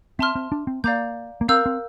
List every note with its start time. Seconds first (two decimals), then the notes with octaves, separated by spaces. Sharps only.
0.19 C4 E5 A5 C6 F6
0.35 C4
0.52 D4
0.67 C4
0.84 A#3 D5 F5 A#5 D6 G6
1.41 A#3
1.48 C4 A#4 F5 A#5 E6 G6
1.66 C4